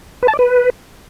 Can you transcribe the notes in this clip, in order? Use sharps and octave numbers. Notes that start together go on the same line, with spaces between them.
B4
A5
D5
B4